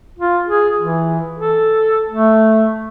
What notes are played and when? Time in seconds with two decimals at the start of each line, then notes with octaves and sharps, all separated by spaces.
0.19 F4
0.47 G#4
0.79 E3
1.37 A4
2.10 A3